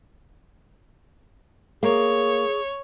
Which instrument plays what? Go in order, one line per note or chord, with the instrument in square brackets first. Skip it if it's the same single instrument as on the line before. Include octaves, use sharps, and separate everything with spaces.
[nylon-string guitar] A#3 [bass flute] G#4 [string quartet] C#5